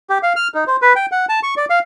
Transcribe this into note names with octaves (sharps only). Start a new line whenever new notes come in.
G4
F5
F6
D#4
C5
B4
G5
F#5
A5
C#6
D5
F5